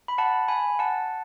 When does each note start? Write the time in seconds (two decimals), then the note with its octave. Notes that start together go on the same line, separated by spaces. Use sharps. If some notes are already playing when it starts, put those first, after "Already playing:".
0.08 B5
0.18 F#5 A5
0.48 G#5 B5
0.79 F#5 A5